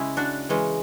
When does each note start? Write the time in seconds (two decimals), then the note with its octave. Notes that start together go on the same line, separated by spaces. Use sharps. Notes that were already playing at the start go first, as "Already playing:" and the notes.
Already playing: C#3 G#3 C#4 E4
0.17 D4 F#4
0.49 E3 G#3 C#4